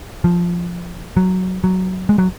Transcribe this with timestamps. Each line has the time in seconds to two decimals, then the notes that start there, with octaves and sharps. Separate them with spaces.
0.24 F3
1.17 F#3
1.64 F#3
2.09 G#3
2.18 F#3